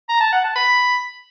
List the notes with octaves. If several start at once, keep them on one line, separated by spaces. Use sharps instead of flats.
A#5
A5
F#5
A5
B5